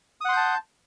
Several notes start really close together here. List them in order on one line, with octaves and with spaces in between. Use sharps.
D#6 F#5 C6 G6 A5